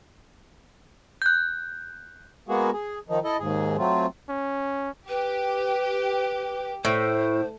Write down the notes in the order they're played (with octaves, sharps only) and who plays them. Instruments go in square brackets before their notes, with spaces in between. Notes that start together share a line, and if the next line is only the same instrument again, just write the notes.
[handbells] F#6 G6
[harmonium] G#3 A#3 B3 F#4 G#4
G#4
D#3 F3 D#4
E4 A4 D#5
D#2 G#2 G#4
F#3 A3 C4 F4
[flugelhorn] C#4
[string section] G4 [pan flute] B4
[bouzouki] A2 [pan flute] C5